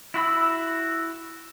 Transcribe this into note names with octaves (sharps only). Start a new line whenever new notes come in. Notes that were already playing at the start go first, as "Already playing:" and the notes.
E4 F#4 B5 E6